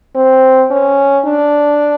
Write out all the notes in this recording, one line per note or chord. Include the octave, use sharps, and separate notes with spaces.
C4
C#4
D4